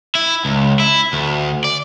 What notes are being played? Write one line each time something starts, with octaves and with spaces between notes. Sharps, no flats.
E4
C#2
E4
D2
D5